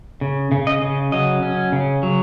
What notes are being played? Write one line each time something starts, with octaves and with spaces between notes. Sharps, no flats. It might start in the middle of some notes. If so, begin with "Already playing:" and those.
C#3
C#3
D#5
C#3
F#3 D#5
C#4
C#3
F#3